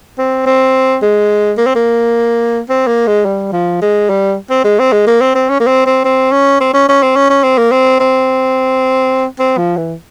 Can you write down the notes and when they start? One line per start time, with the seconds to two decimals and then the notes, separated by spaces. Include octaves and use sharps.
0.19 C4
0.47 C4
1.02 G#3
1.58 A#3
1.67 C4
1.75 A#3
2.70 C4
2.88 A#3
3.07 G#3
3.25 G3
3.53 F3
3.82 G#3
4.10 G3
4.51 C4
4.64 G#3
4.79 C4
4.92 G#3
5.07 A#3
5.21 C4
5.35 C4
5.49 C#4
5.60 A#3
5.67 C4
5.86 C4
6.05 C4
6.32 C#4
6.61 C4
6.74 C#4
6.89 C#4
7.03 C4
7.16 C#4
7.30 C#4
7.43 C4
7.58 A#3
7.72 C4
8.00 C4
9.39 C4
9.58 F3
9.77 E3